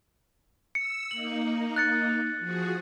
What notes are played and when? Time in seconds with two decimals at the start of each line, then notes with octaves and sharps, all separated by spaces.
0.75 E6 C#7
1.11 A#3 D#4 F#7
1.76 F#6 A6 C#7
2.39 F3 F#4 G#4